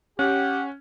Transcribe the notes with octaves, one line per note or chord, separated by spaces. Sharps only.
C#4 G4 F#5